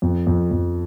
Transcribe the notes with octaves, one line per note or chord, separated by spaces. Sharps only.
F2
F2
F2